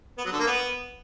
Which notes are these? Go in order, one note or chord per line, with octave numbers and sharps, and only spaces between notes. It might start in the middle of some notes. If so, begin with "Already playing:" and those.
B3
F#3
D3
A#3
B3